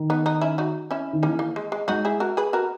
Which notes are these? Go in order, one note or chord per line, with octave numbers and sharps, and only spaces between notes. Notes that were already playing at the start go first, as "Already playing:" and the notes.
Already playing: D#3
B3 D#4
B3 D#4
C#4 E4
D#4 F#4
C#4 E4
D#3
E3 A#3 C#4
A#3
G#3
G#3
G#3 D#4 F#4
E4 G#4
F#4 A#4
G#4 B4
F#4 A#4